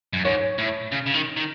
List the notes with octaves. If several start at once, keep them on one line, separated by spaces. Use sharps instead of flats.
F#2
G#2 C#5
A2
C#3
C#3
D#3
D#3